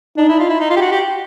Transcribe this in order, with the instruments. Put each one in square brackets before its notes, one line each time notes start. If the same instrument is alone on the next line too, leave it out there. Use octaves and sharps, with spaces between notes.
[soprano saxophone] D4 [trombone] D#4
[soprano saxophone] E4
F4
E4
D#4
F4
G4
F#4
G4